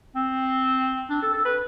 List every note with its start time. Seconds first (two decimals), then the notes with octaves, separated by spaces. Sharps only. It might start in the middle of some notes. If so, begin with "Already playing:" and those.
0.15 C4
1.10 D4
1.23 A4
1.33 A4
1.45 B4